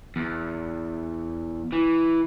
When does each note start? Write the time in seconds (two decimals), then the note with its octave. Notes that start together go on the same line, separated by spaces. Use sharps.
0.16 E2
1.72 E3